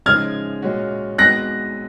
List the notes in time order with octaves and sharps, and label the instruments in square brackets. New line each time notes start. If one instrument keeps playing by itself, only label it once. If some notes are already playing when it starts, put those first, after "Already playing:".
[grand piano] C#3 F3 G#3 D#4 [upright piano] F6 G#6
[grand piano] A#2 G#3 C#4 F#4
[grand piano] G#3 B3 F#4 [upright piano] F#6 A#6